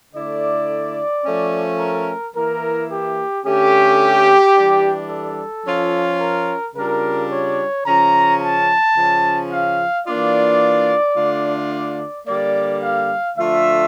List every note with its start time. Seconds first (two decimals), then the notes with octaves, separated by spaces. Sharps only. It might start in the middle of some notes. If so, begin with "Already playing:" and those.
0.14 D3 A3 E4 D5
1.26 F3 A3 C#4
1.80 A#4
2.35 E3 A#3 E4 A#4
2.90 G4
3.45 D3 A3 C#4 G4
4.55 E3 G3 D4
5.10 A4
5.65 F3 C#4 F4
6.21 A#4
6.76 C#3 G3 D4 F4 A#4
7.32 C#5
7.86 C#3 F3 C#4 A#5
8.42 A5
8.96 C#3 F3 C#4
9.52 F5
10.06 E3 A#3 D4 F4 D5
11.17 D3 A3 D4 F4
11.72 D5
12.27 D3 G3 A#3 D5
12.82 F5
13.37 D3 F3 A3 D4 F4 E5